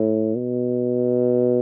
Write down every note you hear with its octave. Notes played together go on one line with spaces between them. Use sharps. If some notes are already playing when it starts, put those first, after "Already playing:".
Already playing: A2
B2